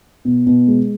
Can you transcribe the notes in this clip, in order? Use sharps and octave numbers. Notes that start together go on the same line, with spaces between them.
B2
B2
G#3